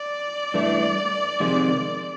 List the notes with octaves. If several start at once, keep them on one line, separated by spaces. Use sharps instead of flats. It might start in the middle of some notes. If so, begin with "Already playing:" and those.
Already playing: D5
G2 E3 A3 D4
F2 C3 D#3 G#3